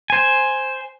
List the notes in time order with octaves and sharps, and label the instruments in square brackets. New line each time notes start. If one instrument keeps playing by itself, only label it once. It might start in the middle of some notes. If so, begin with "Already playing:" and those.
[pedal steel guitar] C5 G#5